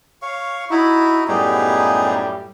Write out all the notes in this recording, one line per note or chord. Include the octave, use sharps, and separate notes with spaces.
C#5 F5 C#6
D#4 E4 F#4
F#2 A2 G3 B3 D#4 G#4